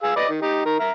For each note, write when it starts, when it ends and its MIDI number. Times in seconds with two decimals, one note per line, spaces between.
0.03 0.15 68
0.03 0.15 77
0.03 0.15 88
0.16 0.28 71
0.16 0.28 74
0.16 0.28 75
0.29 0.40 51
0.42 0.64 63
0.42 0.64 67
0.66 0.79 51
0.66 0.79 70
0.80 0.92 76
0.80 0.92 82
0.80 0.92 89